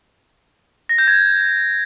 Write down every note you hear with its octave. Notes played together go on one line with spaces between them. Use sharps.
A#6
G6
G#6